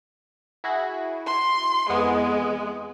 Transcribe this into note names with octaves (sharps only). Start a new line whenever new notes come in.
E4 F#4 G#4
C6
F2 E3 G#3 B3